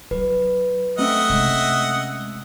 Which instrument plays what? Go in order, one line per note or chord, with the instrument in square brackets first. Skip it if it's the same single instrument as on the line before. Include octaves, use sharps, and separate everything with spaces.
[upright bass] F#3 [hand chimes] B4
[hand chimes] A3 C4 C#4 [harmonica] D#5 E5 F#5
[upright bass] C3 G#3